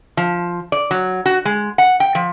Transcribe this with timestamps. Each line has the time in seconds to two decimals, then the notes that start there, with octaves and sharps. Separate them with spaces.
0.17 F3
0.72 D5
0.91 F#3
1.26 F#4
1.45 G#3
1.78 F#5
2.00 G5
2.15 F3